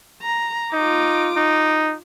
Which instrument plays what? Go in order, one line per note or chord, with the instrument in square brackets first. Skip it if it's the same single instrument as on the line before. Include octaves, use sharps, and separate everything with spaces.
[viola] A#5
[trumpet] D#4 [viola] F4 D6
[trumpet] D#4